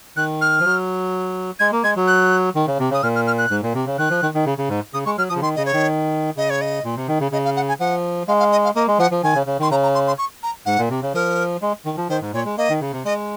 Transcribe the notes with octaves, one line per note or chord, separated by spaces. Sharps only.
D#3 F#6
F6
F3
F#3
G#3 G#6
A#3
G#3 G#6
F#3
F#6
D#3
C#3
C3
C#3 D#6
A#2 F6
F6
F6
F#6
G#2
A#2
C3
C#3
D#3 F#6
F3
D#3
D#3
C#3
C#3
G#2
C#3 D#6
G#3 C#6
F#3 F6
F3 D#6
C#3
D#3 C6
C#3 D#5
C#5
D#3
C#3 D#5
C#5
D#5
A#2
C3
D#3
C#3
C#3 D#5
F5
F#5
G#5
F3 F#5
G#3 F5
F5
D#5
F5
A#3 D#5
G#3
F3 F#5
F3
D#3 G#5
C#3
C#3
D#3 C6
C#3 A#5
A#5
C6
C6
C#6
A#5
G#2 F#5
A#2
C3
C#3
F3 A#4
G#3
D#3
F3
D#3 C5
G#2
A#2 C#5
G#3
A#3 D#5
D#3
C#3
C3
G#3 D#5